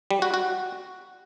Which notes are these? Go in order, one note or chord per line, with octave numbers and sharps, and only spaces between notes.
G3
F#4
F#4